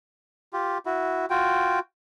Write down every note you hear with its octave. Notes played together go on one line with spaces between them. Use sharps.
F4 G4
E4 F#4
F4 F#4 G5